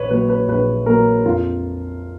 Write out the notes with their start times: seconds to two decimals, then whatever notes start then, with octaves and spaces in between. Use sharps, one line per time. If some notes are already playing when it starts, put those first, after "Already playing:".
Already playing: A#1 B4 C#5
0.10 A#2 F#3 B4
0.29 B4
0.48 A#1 B4
0.86 A#2 F#3 A#4
1.24 F2 F4